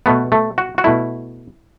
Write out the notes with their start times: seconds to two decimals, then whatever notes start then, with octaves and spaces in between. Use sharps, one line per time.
0.06 B2 A3 B3
0.32 A3
0.58 F#4
0.78 F#4
0.84 B2 A3 E4